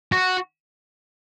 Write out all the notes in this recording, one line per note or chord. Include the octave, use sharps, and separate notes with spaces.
F#4